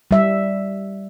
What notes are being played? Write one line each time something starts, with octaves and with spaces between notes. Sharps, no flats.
G3 E5